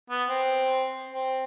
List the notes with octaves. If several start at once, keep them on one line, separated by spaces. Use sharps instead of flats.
B3
C4
C4